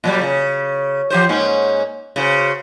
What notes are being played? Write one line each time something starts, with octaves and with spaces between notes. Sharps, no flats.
A#2 F#3 G3
C#3
F3 G4 C5
G#2 A#3 C#4
C#3 F#4 C5